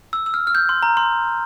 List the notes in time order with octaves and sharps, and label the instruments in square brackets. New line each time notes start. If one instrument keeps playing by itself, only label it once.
[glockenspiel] E6
E6
F6
F6
G6
C6
A#5
C6